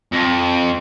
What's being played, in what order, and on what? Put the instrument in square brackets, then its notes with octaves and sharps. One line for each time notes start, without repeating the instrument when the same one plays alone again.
[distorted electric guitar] F2